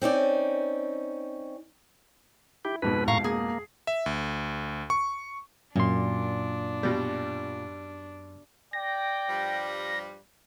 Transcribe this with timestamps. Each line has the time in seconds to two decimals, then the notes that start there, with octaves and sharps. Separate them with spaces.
0.02 C4 C#4 D#4 D5
2.65 E4 G4
2.82 F2 G#2 B2 B4
3.08 A2 F5 A#5 C#6
3.24 A#3 G#4
3.87 E5
4.06 D2
4.90 C#6
5.76 F#2 A#2 D4 C6
6.83 B2 G3
8.73 D5 G5 A#6
9.29 G2 F3 G3